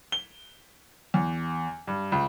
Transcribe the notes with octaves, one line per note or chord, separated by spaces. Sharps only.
G7
E2
G2
C#2